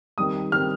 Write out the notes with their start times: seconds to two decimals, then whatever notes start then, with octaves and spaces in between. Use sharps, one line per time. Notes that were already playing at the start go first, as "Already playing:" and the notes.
0.18 D#3 G3 C4 D#6
0.52 D#3 G3 C4 F6